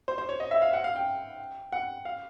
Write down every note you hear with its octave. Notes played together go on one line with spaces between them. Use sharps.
C5
C5
C#5
D#5
E5
F5
F#5
F5
G5
F#5
F5